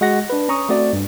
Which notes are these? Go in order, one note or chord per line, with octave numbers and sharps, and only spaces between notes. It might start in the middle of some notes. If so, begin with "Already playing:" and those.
G#3 F#4 F#5 A#6
D4 B4
C#4 A#5 C#6 D#6
A3 C4 F#4 D5
G2